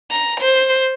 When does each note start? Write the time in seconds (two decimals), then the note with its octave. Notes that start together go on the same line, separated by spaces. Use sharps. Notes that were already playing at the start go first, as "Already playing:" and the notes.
0.11 A#5
0.41 C5